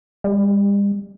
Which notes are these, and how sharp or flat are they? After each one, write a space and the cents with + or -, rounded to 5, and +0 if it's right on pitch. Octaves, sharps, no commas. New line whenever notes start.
G3 +45